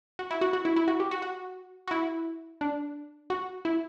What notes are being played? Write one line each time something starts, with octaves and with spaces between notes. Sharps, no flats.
F#4
E4
F#4
F#4
E4
E4
F#4
G4
F#4
F#4
F#4
E4
D4
F#4
E4